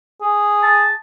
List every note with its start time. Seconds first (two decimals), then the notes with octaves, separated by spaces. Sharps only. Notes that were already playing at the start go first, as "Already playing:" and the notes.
0.21 G#4
0.63 A5